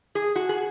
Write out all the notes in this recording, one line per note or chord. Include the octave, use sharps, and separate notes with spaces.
G#4
F#4
G#4